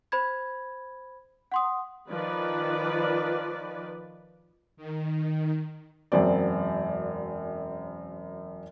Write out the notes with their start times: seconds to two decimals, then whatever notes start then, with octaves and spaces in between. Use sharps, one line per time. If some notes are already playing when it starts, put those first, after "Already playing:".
0.12 C5 B5 G#6
1.52 F#5 C6 D#6
2.10 D#3 F3 B4 D5
4.77 D#3
6.12 E1 F#2 C4 D5